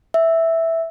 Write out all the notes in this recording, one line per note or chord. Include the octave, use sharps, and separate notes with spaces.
E5